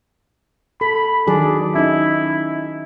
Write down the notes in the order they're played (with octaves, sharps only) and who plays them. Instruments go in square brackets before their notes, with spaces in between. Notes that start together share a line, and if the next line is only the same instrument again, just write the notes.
[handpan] A4 [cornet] B5
[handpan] D#3 F#3 G#4 [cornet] D4
[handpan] C#4 D#4 [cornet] E4